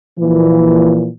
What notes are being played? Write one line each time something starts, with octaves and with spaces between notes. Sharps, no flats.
A#2 E3 F3